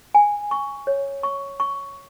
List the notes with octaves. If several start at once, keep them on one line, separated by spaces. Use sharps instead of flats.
G#5
C#6
C#5
C#6
C#6